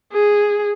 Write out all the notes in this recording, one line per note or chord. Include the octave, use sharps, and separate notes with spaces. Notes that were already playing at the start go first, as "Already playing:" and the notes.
G#4